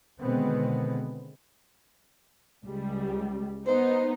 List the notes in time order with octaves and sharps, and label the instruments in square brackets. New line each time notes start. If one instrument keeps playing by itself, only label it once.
[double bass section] B2 D3 D#3 G#3 B3 C4
[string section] C#2 G3
[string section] B3 D#4 [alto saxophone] C5